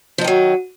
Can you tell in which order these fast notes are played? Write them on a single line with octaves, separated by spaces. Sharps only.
F3 D#4 D#3 F#3